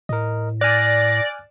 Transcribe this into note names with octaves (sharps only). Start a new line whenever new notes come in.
A2 A#4 D#5
D5 G#5 F6 F#6 A#6